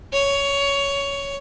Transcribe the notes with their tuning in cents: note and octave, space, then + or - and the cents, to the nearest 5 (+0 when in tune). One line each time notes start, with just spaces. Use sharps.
C#5 +15